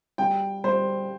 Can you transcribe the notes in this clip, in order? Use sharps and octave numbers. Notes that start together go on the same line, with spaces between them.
G3 G5
G3 C5